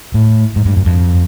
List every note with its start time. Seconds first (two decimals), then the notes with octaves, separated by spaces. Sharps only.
0.14 A2
0.56 G#2
0.66 G2
0.76 F#2
0.86 F2